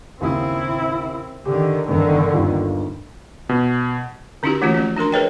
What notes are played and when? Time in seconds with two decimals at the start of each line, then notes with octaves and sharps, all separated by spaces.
0.21 D#2 C#3 C4 E4 D#6
1.46 D3 D#3 G4
1.88 G1 E2 D3 D#3
2.33 G1 D#2 F4
3.49 B2
4.43 D3 C#4 D#4 E4 F#4 G4
4.62 E3 A3 A#3 C#4 F4 F#4
4.74 F3 A3 C#4
4.96 D4 F#4 A#4 C6
5.12 G#4 A#4 B4 C#5 D#5 G5